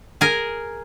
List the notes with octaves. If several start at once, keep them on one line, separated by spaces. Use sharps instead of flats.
G#4 A#4